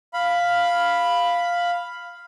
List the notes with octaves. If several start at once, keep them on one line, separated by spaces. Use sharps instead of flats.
F5 B5